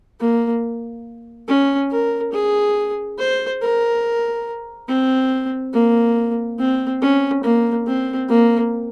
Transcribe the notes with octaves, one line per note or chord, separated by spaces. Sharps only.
A#3
C#4
A#4
G#4
C5
A#4
C4
A#3
C4
C#4
A#3
C4
A#3